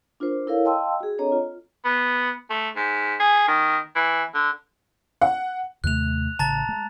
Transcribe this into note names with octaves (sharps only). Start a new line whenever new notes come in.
D4 F4 A#4 C5
E4 A4 A#4 C#5 F5
D#5 F5 G5 A5 C6 E6
F#4 G#4
C4 D4 A4 C#5 D#5 A#5
F4
B3
A3
G#2
G#4
D#3
E3
D3
F#5
D#2 C3 A3 F#6 F7
A1 C#3 A5 A#5 A6
G#3